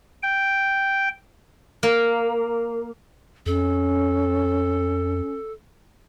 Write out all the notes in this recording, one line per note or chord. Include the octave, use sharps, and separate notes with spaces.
G5
A#3
F2 C#4 A4